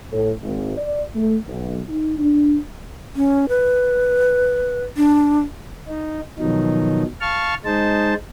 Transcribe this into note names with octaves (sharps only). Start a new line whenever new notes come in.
A2
G#1
D5
A3
B1
D#4
D4
C#4
B4
D4
D#4
B2 D#3 F3 F#3 D#4
F5 A5 C#6 F6
G#3 D#4 C5 A5